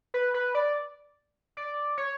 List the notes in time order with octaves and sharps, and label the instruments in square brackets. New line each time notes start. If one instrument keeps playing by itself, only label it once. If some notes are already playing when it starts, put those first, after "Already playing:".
[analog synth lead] B4
B4
D5
D5
C#5